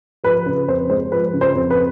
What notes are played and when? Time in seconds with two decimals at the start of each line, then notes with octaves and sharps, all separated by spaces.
0.24 F3 B4
0.46 C#3 B4
0.68 F2 C5
0.89 G#3 C5
1.12 F3 B4
1.33 C#3
1.41 C5
1.55 F2
1.70 B4